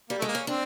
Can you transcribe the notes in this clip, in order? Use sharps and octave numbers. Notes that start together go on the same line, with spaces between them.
G3 A#3
G#3 A3
A#3
C#4
C4 D4